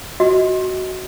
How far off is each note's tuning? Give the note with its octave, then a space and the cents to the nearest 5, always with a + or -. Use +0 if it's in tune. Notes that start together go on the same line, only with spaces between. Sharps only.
F#4 +10 D#5 +30